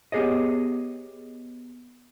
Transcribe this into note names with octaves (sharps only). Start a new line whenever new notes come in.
B3 G4 G#4 C#5 D#5